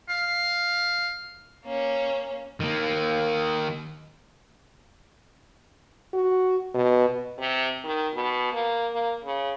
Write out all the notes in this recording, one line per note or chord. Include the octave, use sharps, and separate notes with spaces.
F5
A#3 C#4
D#3 A#3
F#4
B2
C3
D#3
B2
A#3
A#3
C#3